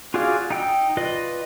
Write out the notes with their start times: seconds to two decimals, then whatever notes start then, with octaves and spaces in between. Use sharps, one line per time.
0.14 F4 F#4 G#4 D5 F5
0.50 D#4 G5 E6
0.97 F4 B4 D5 D#5